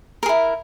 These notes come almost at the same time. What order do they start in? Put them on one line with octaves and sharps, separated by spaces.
A#4 G#4 E4